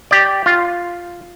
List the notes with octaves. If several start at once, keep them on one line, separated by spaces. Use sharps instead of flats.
G4 D5
F4